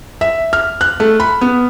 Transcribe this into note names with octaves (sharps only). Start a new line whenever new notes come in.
E5
F6
F#6
A3
B5
B3